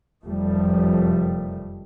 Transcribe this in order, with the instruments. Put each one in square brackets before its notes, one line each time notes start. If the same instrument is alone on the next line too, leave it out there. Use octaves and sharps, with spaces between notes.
[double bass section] F1 F#2 D#3 F3 G3 A3